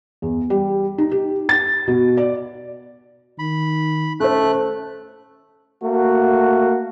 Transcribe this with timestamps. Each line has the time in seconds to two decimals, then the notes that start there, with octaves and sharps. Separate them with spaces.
0.22 E2
0.50 G3
0.98 D#4
1.11 G4
1.49 A6
1.88 B2
2.17 D5
3.39 D#3 B5
4.20 A3 C#4 A4 C5 F#6
5.83 A3 A#3 F#4